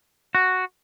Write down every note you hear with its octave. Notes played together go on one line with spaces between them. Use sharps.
F#4